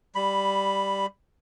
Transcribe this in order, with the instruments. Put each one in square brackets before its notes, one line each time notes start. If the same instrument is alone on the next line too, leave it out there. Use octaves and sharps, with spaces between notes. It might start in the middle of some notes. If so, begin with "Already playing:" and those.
[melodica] G3 B5